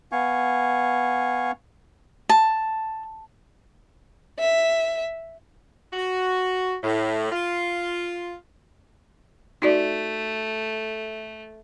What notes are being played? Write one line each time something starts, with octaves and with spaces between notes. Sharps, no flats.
B3 F5 G#5 C#6
A5
E5
F#4
A2
F4
A3 D#4 F#4 D5